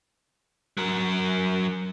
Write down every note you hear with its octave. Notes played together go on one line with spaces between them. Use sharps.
F#3 A#4